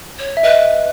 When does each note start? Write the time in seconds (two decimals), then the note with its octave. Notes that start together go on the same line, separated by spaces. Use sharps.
0.19 C#5
0.37 E5
0.43 B4 D#5